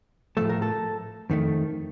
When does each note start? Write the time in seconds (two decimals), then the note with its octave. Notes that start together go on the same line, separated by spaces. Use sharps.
0.37 A2 F3 A3 A4
0.49 A#4
0.62 A4
1.30 F2 D#3 A3